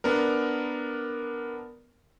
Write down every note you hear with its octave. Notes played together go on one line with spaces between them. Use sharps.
B3 D4 A#4